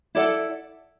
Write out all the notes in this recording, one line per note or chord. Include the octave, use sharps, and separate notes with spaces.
E4 A4 D5 F#5